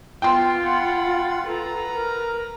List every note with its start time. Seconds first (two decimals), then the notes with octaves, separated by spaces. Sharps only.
0.22 B3 F4 G5 C6
0.65 F#5 B5
1.46 A4 B4 A#5
1.94 A#4